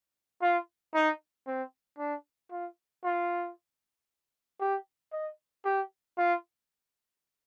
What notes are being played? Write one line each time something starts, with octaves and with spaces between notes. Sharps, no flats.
F4
D#4
C4
D4
F4
F4
G4
D#5
G4
F4